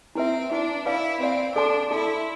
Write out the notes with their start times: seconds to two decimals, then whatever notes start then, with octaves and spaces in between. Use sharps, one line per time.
0.15 C4 E4 B4 E5
0.50 D4 E4 B4 E5
0.86 E4 B4 D5 F5
1.20 C4 B4 D5 F5
1.55 D4 A4 D5 A5 C6
1.90 E4 A4 D5 A5 C6